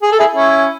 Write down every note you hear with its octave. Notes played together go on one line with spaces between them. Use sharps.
G#4
A4
E4 G#4
C#4 E4